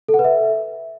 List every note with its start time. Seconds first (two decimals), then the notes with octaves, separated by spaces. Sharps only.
0.08 A4
0.14 F#5
0.19 B4
0.24 E5